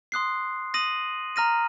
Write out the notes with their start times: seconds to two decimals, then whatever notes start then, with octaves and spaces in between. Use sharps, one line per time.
0.12 C6 D#6 F#6 C7
0.74 D#6 A#6 D#7 F#7
1.36 A#5 F6 A#6 D#7